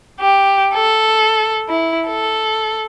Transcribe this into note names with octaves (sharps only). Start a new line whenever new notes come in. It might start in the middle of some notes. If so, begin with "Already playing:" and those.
G4
A4
E4
A4